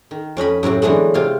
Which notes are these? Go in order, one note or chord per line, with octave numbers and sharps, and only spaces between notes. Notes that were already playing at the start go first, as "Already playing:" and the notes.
D#3
F2 C#4 D#5 B5
F#2 A2 C3 F#4
D3 E3 F#3 G#3 A3 B3
C3 F4 F5